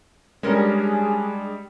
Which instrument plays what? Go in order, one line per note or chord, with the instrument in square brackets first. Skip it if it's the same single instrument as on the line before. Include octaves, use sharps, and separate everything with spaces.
[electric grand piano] G3 G#3 [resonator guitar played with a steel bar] C#4 A#4 [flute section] D4 G#4